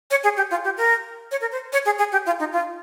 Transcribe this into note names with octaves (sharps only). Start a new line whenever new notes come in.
C#5
G#4
G4
F4
G4
A#4
C#5
A#4
C5
C#5
G#4
G#4
G4
F4
D#4
F4